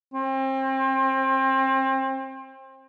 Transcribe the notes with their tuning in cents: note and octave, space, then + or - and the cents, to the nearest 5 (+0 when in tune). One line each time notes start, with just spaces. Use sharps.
C4 +30